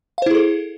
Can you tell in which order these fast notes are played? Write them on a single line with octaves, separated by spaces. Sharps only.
F5 C5 E4 G#4 A4